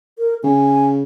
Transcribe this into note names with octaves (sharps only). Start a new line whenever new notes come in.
A#4
C#3 G#5